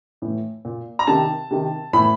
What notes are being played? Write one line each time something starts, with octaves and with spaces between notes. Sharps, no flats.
A2 E3
A#2
A#5
C3 D#3 A5
C3 D#3
A2 E3 B5